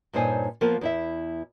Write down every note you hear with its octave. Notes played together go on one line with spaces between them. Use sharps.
G2 A#2 D#4 C5 C#5 G#5
F3 A#3 B3 A#4 B4
E2 E4 E5